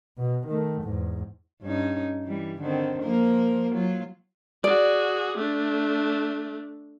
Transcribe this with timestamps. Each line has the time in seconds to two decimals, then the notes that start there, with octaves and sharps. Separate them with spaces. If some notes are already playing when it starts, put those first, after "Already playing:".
0.18 B2
0.48 D#3 A3
0.82 E2 G#2
1.62 G2 C#4 D#4
2.24 E3 G3
2.60 D3 D#3 C4
3.02 F3 A#3 A#4
3.73 F#3 F4
4.64 F#4 G#4 D5
5.38 A3 D4